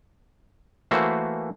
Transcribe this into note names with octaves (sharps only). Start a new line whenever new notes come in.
E3 A3 A#3 F#4 C5